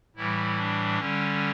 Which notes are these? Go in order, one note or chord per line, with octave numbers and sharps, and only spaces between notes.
A2 E3 G3 E4
D4
D3 G3 C#4